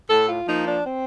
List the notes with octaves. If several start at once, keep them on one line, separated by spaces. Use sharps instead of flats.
A2 A4
F4
F3 A#3 D#4
D4
C4